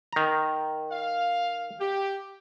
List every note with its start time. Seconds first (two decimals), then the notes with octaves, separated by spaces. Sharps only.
0.13 D#3 A#5
0.91 F5
1.79 G4